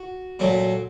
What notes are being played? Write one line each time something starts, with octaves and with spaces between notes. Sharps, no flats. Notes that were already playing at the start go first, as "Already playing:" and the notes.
Already playing: F#4
A#2 F#3 A3